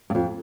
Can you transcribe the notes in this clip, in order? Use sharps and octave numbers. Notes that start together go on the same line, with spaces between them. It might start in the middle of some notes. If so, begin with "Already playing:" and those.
G2
F2